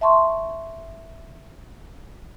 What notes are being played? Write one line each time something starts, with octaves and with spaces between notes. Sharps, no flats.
E5 A5 C6 C#6